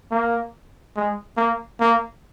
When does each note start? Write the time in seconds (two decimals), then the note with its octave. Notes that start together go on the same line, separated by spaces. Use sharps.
0.11 A#3
0.96 G#3
1.37 A#3
1.80 A#3